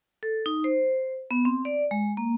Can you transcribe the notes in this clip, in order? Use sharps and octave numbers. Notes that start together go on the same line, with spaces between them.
A4
D#4
C5
B3
C4
D5
G#3
A#3